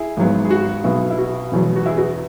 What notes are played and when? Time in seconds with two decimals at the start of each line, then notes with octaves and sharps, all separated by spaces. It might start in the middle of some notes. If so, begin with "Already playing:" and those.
Already playing: E4 G#4
0.17 G#1 G#2 F#3 B3
0.45 G#4
0.51 F#4
0.84 B1 B2 B3 E4
1.10 E4
1.18 F#4
1.52 E1 E2 B2 F#3
1.76 F#4
1.86 E4 G#4
1.97 F#4 B4